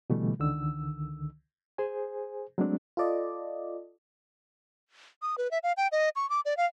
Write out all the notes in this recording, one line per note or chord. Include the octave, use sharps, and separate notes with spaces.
B2 D3 E3 G3 A3
C#2 D3 D#3 E6
G#4 C5 G#5
F#3 G#3 A3 C4 D4
F4 A4 D5 D#5
D#6
B4
E5
F5
G5
D#5
C#6
D6
D5
F5